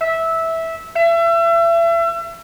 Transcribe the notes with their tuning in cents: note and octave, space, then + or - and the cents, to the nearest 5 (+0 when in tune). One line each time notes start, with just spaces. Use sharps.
E5 -10
E5 +35